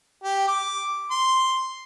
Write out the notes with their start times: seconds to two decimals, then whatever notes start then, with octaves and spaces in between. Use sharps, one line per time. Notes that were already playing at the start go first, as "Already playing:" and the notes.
0.24 G4
0.48 D6
1.11 C6